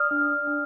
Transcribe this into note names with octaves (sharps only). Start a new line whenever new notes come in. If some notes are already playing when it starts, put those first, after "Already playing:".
Already playing: D5 D#6 F6
D4
D4